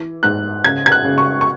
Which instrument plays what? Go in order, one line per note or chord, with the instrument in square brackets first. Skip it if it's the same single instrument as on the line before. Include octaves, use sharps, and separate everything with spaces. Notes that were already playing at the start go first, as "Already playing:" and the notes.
Already playing: [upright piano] E3
G#2 F#6
C#3 G#6
G#6
F#6
C#3
C#6
C#6